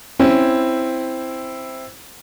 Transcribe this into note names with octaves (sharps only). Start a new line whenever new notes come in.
C4 C#4 E4